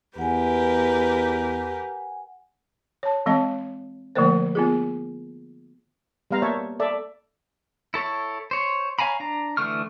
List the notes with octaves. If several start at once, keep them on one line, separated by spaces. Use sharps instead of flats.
E2 G4 A#4 B4 F#5 G#5
C#5 A5
E3 G#3 C4 D#5 A5
D3 F3 A3 A#3 A#4 C5
B3 F4 G#4
G3 B3 F5 A#5
A#3 C#5 E5 A5
A4 D5 E5
E4 A4 C#5
C5 C#5
C#5 F5 G#5 A#5 B5
D4 A#5
D3 E3 A3 C#6 F6